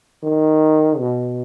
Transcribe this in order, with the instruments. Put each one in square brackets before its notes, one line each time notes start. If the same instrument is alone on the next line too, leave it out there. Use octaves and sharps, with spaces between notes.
[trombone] D#3
B2